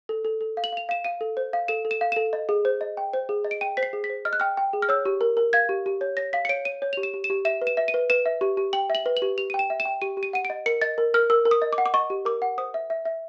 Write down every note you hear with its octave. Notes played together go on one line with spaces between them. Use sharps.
A4
A4
A4
F5
F#7
F5 F7
F5 E7
F5 D#7
A4
C5
F5
A4 E7
A4
E7
F5
A4 E7
D#5
G#4
C5
D#5
G5
C5
G#4
D#5
D7
G5 D#7
C5 B6
C7
G#4
B6
C5
D#5 F6
F#6
G5 F6
G5
G#4
F6
C#5 E6
G4
A#4
A#4
F5 G#6
G4
G4
C#5
C#5 A#6
F5 B6
C#7
C#5 D7
C#5 D#7
C#5
G4 F7
E7
G4
E7
G4
E5 E7
B4
E7
E5
D#7
B4
B4 E7
E5
G4
G4
G5 F#7
E5 F#7
B4
F#7
G4
G4 F7
G5 D#7
E7
E5
E7
G5
G4 D#7
G4
D#7
F#5 D#7
D7
D#5
A#4 C#7
D#5 A6
A#4
A#4 F6
A#4 E6
A#4
D#6
D#5
D6
F#5
D6
D#5 C#6
G4
A#4 D6
F#5
C5 D#6
E5
E5
E5